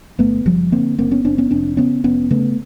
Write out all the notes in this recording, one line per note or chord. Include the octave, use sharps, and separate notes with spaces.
G1 A3 B3
F#1 F3 G3
D3 A#3 C4
F#1 A#3 C4
B3 C#4
F#1 C4 D4
B3 C#4
F1 C4 D4
C#3 B3 C#4
F1 B3 C#4
C#3 A3 B3